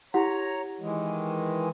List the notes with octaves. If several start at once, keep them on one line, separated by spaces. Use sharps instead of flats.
E4 G4 C#5 F#5 A#5
D#3 E3 G#3